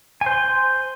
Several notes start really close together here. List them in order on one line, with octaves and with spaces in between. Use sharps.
G#5 C5 C6